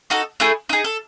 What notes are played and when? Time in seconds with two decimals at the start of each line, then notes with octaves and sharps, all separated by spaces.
0.10 D#4 F#4 A4
0.40 A3 E4 G#4
0.69 D#4 G#4
0.84 A4